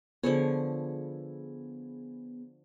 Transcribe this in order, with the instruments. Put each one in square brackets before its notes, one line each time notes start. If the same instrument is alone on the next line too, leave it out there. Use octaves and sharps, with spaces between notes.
[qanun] D3 F3 C#5 [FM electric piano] B3 G#4